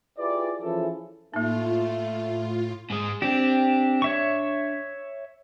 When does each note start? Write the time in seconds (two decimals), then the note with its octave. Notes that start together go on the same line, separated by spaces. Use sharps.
0.18 E4 F4 G4 G#4 B4 D5
0.62 E3 F3 C#4 E4 G#4 A4
1.34 A2 A3 A#3 D#4 F4
2.90 G#2 G#3
3.22 C4 D4 G4
4.02 C#5 E5 C#6